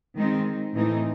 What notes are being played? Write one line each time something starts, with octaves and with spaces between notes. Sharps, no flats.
D#3 G#3 C4 D#4
A2 E3 A3 C4 D#4